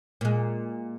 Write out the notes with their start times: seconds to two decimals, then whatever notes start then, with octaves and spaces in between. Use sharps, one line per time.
0.21 A#2 G#3